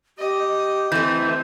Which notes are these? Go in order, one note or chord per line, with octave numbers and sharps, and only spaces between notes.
G4 D#5
E3 A3 C4 G6